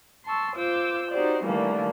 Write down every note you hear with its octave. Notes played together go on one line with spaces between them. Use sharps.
A5 C6 C#6 E6
F4 C5 D6 E6 G6
D#4 F#4 G4 C5 D5
D#3 E3 G3 A3 A#3 D4